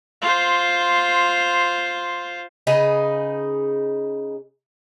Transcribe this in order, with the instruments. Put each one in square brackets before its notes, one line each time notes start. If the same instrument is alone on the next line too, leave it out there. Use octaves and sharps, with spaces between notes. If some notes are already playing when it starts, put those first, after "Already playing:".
[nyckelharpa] F4 C5
[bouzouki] C#3 D#4 G#4 B4